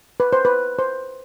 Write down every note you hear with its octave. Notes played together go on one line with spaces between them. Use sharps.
B4
C5
B4
C5